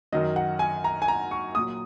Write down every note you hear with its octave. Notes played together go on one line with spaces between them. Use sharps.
F#2 D#3 F#3 D#5
F#5
G#5
A#5
G#5
A#5
C#6
A#2 F#3 D#6